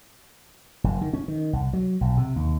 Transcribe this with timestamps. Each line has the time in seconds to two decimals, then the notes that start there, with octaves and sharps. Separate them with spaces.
0.84 F#1
1.01 D#3
1.13 C#4
1.28 D#3
1.53 C2
1.73 F#3
2.01 B1
2.17 C3
2.36 D#2